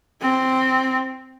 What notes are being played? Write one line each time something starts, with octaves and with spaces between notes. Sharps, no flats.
C4